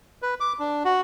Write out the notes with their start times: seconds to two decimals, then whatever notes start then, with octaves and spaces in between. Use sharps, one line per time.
0.22 B4
0.40 D6
0.59 D4
0.85 F#4